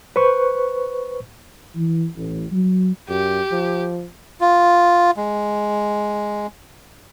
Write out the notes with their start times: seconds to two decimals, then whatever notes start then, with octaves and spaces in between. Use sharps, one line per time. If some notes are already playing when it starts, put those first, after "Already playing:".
0.16 B4 C5 C#6
1.74 E3
2.15 A1
2.52 F#3
3.09 F#2 G4
3.52 F3
4.41 F4
5.17 G#3